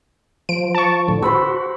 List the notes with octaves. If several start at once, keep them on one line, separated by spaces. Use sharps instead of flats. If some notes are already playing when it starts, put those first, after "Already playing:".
F3 D7
A5 C#6
A2 D3
F#4 C5 B5 E6